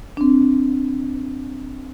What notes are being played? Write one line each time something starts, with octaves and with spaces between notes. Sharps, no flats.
C4 D4